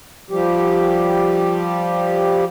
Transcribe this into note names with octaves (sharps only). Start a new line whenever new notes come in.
F3 G3 G4